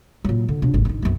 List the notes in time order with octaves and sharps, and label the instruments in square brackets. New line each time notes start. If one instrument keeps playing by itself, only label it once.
[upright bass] A#2 F#3
D3
B2 D4
G#1 D#2
D3 D#3
B1 F#2